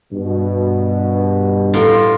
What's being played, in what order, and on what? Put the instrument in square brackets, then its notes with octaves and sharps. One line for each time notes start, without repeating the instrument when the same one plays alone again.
[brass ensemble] G2 B2
[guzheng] A2 F4 A#4